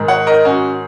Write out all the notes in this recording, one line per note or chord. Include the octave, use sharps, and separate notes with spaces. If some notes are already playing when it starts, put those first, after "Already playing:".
Already playing: G#2 D#3
C#5 F#5
A#4 D#5
C#4 F#4